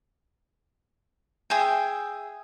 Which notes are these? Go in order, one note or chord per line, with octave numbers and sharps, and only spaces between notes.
G#4 E5 G5